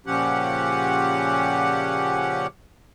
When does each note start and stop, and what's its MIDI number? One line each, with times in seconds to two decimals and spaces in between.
0.06 2.47 46
0.06 2.47 49
0.06 2.47 53
0.06 2.47 61
0.06 2.47 67
0.06 2.47 78